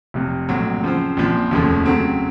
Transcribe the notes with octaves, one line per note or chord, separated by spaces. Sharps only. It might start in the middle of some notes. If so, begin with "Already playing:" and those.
F1 F2 C3
A#1 A2 F#3 C4
C#3 F3 C4 F4 C5
A#1 A#2 F3 C4
F1 D#2 C#3 F3 A3
C#3 F#3 A3 C4